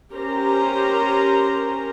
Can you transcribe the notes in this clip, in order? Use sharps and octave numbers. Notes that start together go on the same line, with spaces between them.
C#4 G4 A#4 C5 A#5